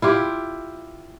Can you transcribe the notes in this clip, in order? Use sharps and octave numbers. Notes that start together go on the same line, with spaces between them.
E4 F4 G4